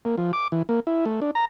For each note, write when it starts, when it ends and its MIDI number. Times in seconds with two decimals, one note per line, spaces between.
0.05 0.16 58
0.18 0.32 53
0.33 0.48 86
0.52 0.62 52
0.69 0.80 58
0.87 1.05 64
1.05 1.20 57
1.22 1.31 62
1.35 1.45 82